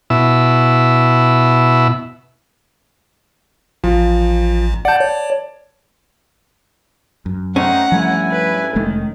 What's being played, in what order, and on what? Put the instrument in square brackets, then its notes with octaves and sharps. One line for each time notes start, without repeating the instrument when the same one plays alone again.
[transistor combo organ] B2 E4 E6
[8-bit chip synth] A1 [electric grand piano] F3
[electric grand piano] D5 A5 [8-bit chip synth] F#5 G6
[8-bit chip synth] C#5
[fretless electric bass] F#2
[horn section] A3 C4 D#4 [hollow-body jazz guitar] C#4 [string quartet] F#5 A#5
[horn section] G2 E4 G#5 [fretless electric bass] F3 G3 A3
[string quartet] B4
[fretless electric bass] F1 G#3 A3 [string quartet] D#3